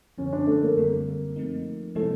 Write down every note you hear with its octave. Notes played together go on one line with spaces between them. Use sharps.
F#2 D3 F3 C#4
D4
A3
A#3
F#2 D3 G3 A#3 C4
F3 A3 C4 D#4
C3 F3 G#3 A3 C4 E4